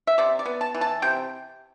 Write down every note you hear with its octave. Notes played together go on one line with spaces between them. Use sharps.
E5
C3 D5
D5
B3
A5
E3
A5
C3 G5